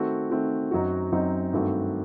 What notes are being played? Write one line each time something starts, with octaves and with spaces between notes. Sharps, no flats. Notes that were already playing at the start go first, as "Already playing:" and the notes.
Already playing: D#3 A3 C4 F#4
D#3 A3 C4 F#4
F#2 F#3 C4 D#4 F#4
F#2 F#3 C4 D#4 F#4
G2 D#3 A3 C4 F#4